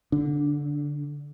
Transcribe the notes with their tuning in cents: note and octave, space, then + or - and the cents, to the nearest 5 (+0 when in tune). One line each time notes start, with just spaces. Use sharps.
D3 -15 D4 +0